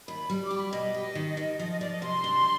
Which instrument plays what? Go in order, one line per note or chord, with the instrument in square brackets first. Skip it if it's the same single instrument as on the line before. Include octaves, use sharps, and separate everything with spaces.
[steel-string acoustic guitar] D#2 [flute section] B5
[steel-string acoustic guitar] G3
[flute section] D6
[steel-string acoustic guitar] G4
[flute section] B5
[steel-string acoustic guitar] B2 [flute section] D#5
[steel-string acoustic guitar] G4
D#3
D#3
[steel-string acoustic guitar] F3 [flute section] D#5
[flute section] D#5
[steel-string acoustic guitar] F3 [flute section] D5
[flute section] D#5
[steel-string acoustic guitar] C3 [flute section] C6
[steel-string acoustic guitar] D4